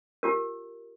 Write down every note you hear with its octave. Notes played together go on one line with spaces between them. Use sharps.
F4 G4 A#4